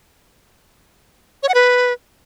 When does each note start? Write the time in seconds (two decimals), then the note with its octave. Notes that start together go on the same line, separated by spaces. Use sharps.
1.43 C#5
1.49 F#5
1.54 B4